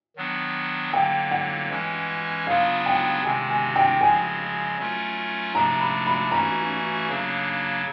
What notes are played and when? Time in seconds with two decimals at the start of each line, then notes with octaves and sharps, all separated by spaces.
0.16 D#3 F#3 B3 D4
0.93 D3 F#3 A#3 G5
1.31 F#5
1.70 E3 G#3 C#4
2.47 C#3 F#3 B3 D4 F4 F5
2.86 G5
3.24 C3 D#3 G#3 C4 G#5
3.49 G#5
3.76 G5
4.01 C#3 F3 G#3 C4 G#5
4.78 F#3 A3 C#4 F4 A#4
5.55 C3 F3 A3 D4 A#5
5.80 B5
6.07 B5
6.31 E3 A3 C#4 F#4 A#5
7.08 C#3 F#3 A#3 D4